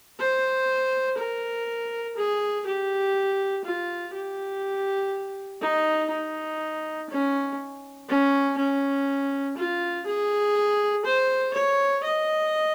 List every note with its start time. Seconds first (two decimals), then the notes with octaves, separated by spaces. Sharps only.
0.20 C5
1.18 A#4
2.17 G#4
2.66 G4
3.65 F4
4.14 G4
5.62 D#4
6.11 D#4
7.10 C#4
8.09 C#4
8.58 C#4
9.57 F4
10.06 G#4
11.05 C5
11.54 C#5
12.04 D#5